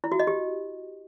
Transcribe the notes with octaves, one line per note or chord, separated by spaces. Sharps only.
E4
F#4
D#5
G4